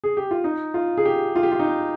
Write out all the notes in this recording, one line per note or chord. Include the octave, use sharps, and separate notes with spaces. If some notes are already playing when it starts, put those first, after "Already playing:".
G#4
G4
F4
D#4
F4
G#4
G4
F4
G4
F4
D#4